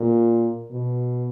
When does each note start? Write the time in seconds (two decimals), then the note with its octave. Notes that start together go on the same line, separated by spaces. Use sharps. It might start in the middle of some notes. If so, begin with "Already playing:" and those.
Already playing: A#2
0.71 B2